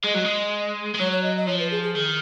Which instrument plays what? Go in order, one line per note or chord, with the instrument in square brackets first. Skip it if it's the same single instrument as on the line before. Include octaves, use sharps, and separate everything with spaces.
[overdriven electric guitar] G#3 [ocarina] D#5
[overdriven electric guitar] F#3
G#3
G#3
[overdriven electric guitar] F#3 [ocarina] C#5
[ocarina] C#5
D#5
D#5
[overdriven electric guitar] F3 [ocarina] C#5
[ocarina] B4
G#4
G#4
[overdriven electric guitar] D#3 [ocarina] G#4